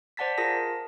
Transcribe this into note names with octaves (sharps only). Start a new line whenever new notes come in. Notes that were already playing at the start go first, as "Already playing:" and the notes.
C5 D5 F#5 A5 A6 B6
F4 G#4 A#4 A5 A#6